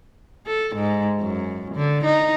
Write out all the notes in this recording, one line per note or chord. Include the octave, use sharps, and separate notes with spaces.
A4
G#2
F#2
D3
D#4